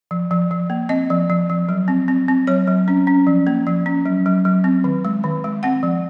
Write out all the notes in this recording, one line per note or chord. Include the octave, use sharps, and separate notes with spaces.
F3
F3
F3
A#3
C4 D#5
F3
F3
F3
F#3
C4
C4
C4
F#3 C#5
F#3
C#4
C#4
F3
A#3
F3
C#4
F#3
F#3
F#3
C4
D#3
G#3
D#3
G#3
C4 F#5
F3